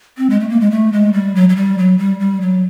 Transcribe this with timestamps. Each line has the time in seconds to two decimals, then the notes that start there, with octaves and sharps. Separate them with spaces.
0.18 C4
0.30 G#3
0.40 A3
0.50 A#3
0.60 G#3
0.71 A3
0.92 G#3
1.13 G3
1.35 F#3
1.49 F#3
1.56 G3
1.78 F#3
1.98 G3
2.20 G3
2.41 F#3